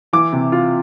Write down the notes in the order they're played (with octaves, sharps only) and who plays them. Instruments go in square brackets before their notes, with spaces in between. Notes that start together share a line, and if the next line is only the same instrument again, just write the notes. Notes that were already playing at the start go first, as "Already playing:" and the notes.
[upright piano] E3 D6
C3
F4